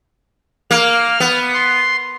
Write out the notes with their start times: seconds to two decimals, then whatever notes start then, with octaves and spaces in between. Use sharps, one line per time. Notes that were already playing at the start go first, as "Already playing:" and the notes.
0.71 A#3 F6
1.20 B3
1.53 C6